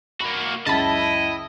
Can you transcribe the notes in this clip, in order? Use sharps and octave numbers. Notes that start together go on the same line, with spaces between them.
A#3 F#4 B5
C#2 F#2 E4 D#5 A5 B5